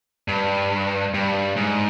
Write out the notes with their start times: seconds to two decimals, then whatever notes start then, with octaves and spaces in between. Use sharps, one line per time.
0.28 G2
1.14 G2
1.56 G#2